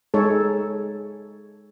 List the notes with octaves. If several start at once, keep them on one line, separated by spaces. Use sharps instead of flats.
G#3 D#4 A4 C#5